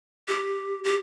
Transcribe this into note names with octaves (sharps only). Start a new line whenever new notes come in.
G4
G4